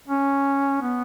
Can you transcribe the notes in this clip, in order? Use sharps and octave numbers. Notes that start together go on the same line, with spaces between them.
C#4
B3